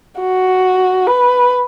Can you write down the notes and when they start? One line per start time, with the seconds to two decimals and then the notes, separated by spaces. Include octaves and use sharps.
0.19 F#4
1.07 B4